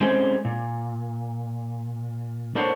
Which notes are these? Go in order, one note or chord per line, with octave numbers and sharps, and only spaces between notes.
G#3 C4 C#4 G#4 A4 C5
A#2
A#3 D4 A4 C5 C#5 F#5